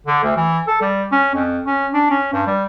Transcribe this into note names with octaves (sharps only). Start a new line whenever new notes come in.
D3
D2
E3
A4
G3
C#4
F2
C#4
D4
C#4
G2
G3